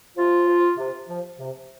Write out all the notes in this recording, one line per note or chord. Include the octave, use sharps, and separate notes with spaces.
C3 F3 F4
F3
C3
F3
C3